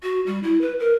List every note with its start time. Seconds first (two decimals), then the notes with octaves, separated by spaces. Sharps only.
0.02 F#4
0.26 G3
0.43 E4
0.61 B4
0.79 A#4